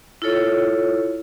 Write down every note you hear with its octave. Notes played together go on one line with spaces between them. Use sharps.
E4 F4 A4 C#5